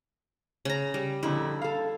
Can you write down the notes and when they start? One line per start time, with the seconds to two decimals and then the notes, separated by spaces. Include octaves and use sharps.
0.65 C#3 A#5
0.94 G3
1.23 F2 A#2 D3 E4
1.61 A4 F5